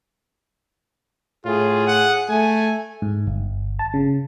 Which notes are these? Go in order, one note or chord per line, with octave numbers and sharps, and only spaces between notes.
A2 F4 G#4
F#5
A3 G#5
G#2
G1
A5
C#3